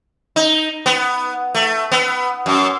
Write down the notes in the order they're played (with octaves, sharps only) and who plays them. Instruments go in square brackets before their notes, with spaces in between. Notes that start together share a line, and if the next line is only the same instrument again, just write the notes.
[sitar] D#4
B3
A3
B3
F#2